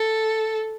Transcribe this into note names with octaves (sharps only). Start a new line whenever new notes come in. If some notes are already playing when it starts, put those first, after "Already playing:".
Already playing: A4